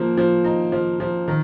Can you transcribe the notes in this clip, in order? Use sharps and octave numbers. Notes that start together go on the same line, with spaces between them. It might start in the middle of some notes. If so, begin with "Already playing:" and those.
Already playing: F3 A#3
F3
D#4
F3
F3
D#3